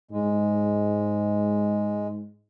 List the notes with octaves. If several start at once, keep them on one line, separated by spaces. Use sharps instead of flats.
G#2 G#3